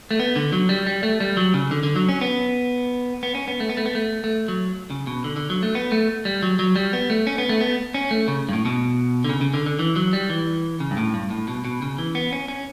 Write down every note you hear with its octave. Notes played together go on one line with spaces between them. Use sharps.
A3
B3
D3
F#3
G3
G3
A3
G3
F#3
C#3
D3
D3
F#3
C#4
B3
B3
C#4
B3
A3
B3
A3
B3
A3
A3
F#3
C#3
B2
D3
D3
F#3
A3
B3
A3
G3
F#3
F#3
G3
B3
A3
C#4
B3
A3
B3
C#4
A3
C#3
G2
A2
B2
D3
C#3
C#3
D3
D3
E3
F#3
G3
E3
C#3
G2
A2
G2
A2
B2
B2
C#3
E3
B3
C#4
C#4